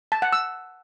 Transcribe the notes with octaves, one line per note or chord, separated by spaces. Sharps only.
A5
F#5
E6